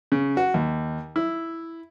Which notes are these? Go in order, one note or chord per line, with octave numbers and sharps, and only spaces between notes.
C#3
F#4
D#2
E4